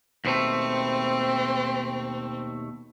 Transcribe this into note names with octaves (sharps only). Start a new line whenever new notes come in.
D#2 B2 A3 C4